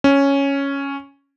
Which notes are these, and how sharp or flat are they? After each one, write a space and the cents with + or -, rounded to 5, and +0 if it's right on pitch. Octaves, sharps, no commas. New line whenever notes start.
C#4 +0